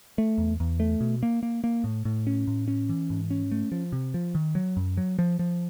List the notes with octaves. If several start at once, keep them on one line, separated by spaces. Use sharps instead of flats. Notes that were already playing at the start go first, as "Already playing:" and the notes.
A3
E2
E2
A3
B2
A#3
A#3
A#3
A2
A2
C#4
A2
C#4
E3
G#2
C#4
A3
F3
C3
F3
D#3
F#3
F#2
F#3
F3
F3